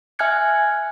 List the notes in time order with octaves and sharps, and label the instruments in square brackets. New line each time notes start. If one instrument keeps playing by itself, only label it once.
[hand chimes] E5 G#5 F6 F#6 G#6 C#7